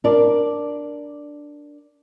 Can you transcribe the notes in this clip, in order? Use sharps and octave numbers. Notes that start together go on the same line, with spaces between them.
D4 A#4 D5